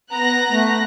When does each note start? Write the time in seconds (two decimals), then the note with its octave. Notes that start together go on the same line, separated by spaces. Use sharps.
0.12 B3 A#5 F#6 A#6
0.51 A3